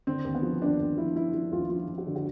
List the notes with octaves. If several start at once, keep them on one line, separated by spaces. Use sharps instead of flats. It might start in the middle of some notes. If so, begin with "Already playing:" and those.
D3 C4
D#2
B3
F3
D#2 D4
D#2
F3 E4
F3 E4
F3
D#2 F4
F3 F4
F3
F#4
D3
F#4